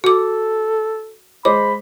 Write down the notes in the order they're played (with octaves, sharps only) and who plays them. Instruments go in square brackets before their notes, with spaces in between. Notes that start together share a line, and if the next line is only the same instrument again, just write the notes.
[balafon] F#4 D6 [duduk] A4
[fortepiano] G#3 C5 D#5 [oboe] B5 [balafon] D6